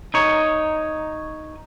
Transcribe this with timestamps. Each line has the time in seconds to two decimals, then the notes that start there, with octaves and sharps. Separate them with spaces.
0.14 D#4 C#5